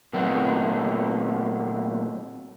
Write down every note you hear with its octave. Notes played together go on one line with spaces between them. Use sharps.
A#2 F#3 A3 B3 C4